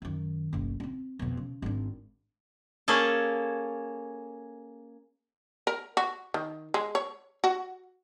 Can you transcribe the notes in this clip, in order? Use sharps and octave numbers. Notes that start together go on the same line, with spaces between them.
F#2 D#3
F#1 B1
C4 D4
F2 B2
C#3
G#1 D4
A#3 C#4 G#4 A4
A#4
F#4
D#3
G#3
C#5
F#4